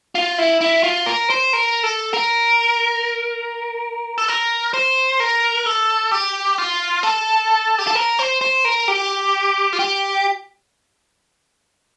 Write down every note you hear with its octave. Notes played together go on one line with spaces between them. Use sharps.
F4
E4
E4
F4
A#4
C5
A#4
A4
A#4
A4
A#4
C5
A#4
A4
G4
F4
A4
G4
A4
A#4
C5
C5
A#4
G4
F4
G4